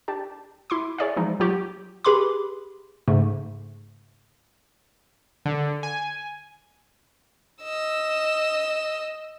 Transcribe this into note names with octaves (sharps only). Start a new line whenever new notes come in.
D4 G4 A5
E4 C6 D6
G#4 C#5 D5 E5 F5
E3 F3 G#3 D#4
F#3 F4 G4 C#5
G4 G#4 B4 B5 C6 D6
G#2 C#3 A3
D3
G#5
D#5 E6